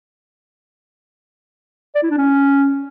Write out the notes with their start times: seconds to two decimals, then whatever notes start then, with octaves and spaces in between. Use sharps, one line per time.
1.95 D5
2.03 E4
2.10 D4
2.18 C#4